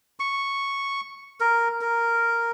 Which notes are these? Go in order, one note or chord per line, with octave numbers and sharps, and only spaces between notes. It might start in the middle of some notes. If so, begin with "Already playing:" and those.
C#6
A#4
A#4